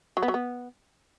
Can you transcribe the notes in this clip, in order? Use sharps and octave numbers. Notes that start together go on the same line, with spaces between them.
F#3
B3
F#3
B3